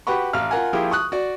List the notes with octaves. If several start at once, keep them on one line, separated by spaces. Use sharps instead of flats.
F#4 G4 B4 F#5 B5 C#6
A1 F5 F6
F4 A#4 F#5 G#5
F3 A#3 E4 F4 G4 G#4
C#6 D#6 F#6
F#4 D5